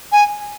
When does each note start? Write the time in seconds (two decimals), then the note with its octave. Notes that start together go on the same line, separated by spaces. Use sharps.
0.12 G#5